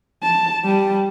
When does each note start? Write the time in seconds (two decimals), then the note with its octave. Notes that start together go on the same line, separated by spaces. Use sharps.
0.23 A5
0.65 G3